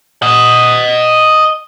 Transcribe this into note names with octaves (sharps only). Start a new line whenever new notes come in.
D#5 F#5